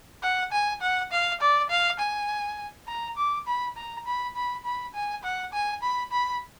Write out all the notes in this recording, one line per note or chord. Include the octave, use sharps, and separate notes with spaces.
F#5
G#5
F#5
F5
D5
F5
G#5
A#5
D6
B5
A#5
B5
B5
B5
G#5
F#5
G#5
B5
B5